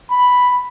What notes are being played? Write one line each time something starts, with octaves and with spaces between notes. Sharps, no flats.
B5